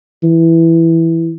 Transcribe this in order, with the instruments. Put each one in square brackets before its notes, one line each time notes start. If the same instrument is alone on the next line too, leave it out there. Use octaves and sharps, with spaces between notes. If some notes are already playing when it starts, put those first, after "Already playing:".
[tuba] E3